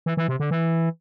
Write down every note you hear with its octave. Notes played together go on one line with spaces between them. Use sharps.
E3
E3
C3
D3
E3